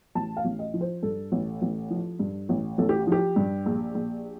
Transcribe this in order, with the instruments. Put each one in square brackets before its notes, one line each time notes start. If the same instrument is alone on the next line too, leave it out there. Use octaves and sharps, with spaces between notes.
[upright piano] A1 A5
F5
A1
D#5
F3
C5
G2 A4
A1
A1
F3
G2
A1
A1 A4
G4
F3 G4
G2
A#1
A#1